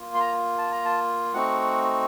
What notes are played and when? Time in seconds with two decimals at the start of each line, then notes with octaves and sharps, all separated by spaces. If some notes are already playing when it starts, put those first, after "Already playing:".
Already playing: A#3 F4
0.15 C6
0.20 A#5
0.58 A5
0.71 A#5
0.85 A5
1.34 A3 C4 D#4 F#4 F#5